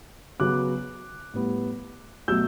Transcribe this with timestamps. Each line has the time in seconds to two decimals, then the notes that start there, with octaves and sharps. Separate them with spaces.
0.40 C#3 F#3 B3 D6 F#6
1.34 A2 G3 B3
2.28 B2 F#3 A3 E6 G6